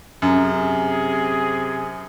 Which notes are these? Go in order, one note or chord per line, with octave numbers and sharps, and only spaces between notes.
F#2 C3 G#4